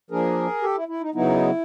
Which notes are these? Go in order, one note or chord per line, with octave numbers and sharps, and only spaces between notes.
F3 A#3 D4 G#4 A#4
G4 A4
E4
E4
D#4
C#3 F#3 B3 D#4 E4